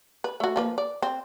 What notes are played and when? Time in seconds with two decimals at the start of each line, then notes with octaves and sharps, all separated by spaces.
0.24 B4
0.40 A3 F#4
0.56 F3 A#3 B4
0.78 D5
1.02 C4